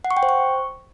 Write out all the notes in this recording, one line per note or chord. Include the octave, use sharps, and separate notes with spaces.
F#5
C#6
G5
C5
C#6